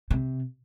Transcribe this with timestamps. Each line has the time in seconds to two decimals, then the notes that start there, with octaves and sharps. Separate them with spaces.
0.11 C3